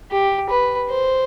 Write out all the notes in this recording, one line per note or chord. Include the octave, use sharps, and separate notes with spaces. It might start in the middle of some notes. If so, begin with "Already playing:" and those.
G4
B4
C5